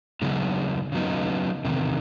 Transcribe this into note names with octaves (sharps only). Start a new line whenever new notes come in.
C#3 F#3 B3 D#4
C#3 F#3 B3 D#4
E2 C3 D#3